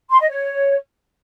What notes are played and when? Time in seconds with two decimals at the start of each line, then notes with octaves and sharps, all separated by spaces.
0.11 C6
0.20 D#5
0.29 C#5